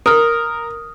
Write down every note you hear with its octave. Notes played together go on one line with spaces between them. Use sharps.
A#4 D#6 F6